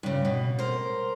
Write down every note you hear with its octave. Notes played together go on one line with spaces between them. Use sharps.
G2 C#3
B2
A#4 C5